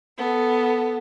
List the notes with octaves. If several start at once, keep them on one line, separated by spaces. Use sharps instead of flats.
B3 A4